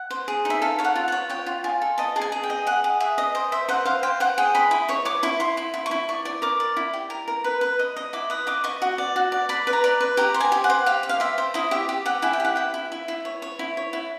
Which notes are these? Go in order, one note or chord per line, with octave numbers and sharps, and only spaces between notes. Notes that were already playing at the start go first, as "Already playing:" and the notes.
Already playing: F#5
C5
G#4
D#4
E5
A4 F5
C#5 F5
F#5
F4
C#5 F#5
C#5 G5
F4
F4 G#5
A4
D#5 A5
G#4 A5
G#5
G#4
G5
D#5
G#4 F#5
G#4
G#4 E5
D#5
C5 D#5
C5 E5
C5 F#5
C5 F5
C5 G5
C5 F#5
G#4 G5
D#5 B5
E4 B5
C#5 C#6
C#5 D6
E4 C#6
E4 C6
E4
E4
C#6
E4
D5 C#6
D5
A#4 D6
D5
E4
G4
A#4
A#4
B4
B4
D#5
D#5
E4 D6
B4 D#6
D#5 D6
D#5 C#6
F#4
D5
F#4
D5
D5 B5
B4
A#5
D5
B4
G4 A#5
C5
G#5
G4
F#5
C5
G4 F5
G4
F5
C5 E5
C5
E4 D#5
G4 E5
G4
G4 F#5
E4 G#5
G5
G4 F#5
E4 G5
E4
E4
E4
C#5
C#5
E4
C#5
E4